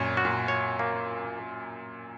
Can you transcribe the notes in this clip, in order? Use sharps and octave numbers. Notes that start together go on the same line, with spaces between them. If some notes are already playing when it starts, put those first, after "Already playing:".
Already playing: F#2 A#2 C#5
F#4
A#2
C#5
A#3